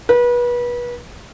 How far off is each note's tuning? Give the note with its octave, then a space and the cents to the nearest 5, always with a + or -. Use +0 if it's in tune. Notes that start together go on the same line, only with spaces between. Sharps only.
B4 -30